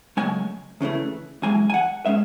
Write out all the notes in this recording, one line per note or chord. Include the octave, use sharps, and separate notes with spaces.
C#2 C#3 F#3 A3 G#5
D2 C#3 E3 A3
F#2 E3 G#3 G#5
G#5
F#5
G#3 C#4 E5